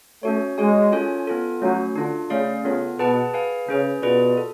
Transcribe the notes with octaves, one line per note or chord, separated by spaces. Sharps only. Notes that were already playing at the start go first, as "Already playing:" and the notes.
A3 C#4 F#4 C#5
G#3 F#4 C#5 G#5
C#4 F4 A4 C#5 G#5
B3 F4 A4
F#3 A3 C#4 F#4
D3 D4 F4 A4
C#3 A3 C#4 G#4 D5 F5
C#3 B3 F4 A4
B2 G#4 B4 F#5 A5
G#4 B4 F5 G#5
C#3 C#4 G#4 B4
B2 F4 G#4 B4 D5
A4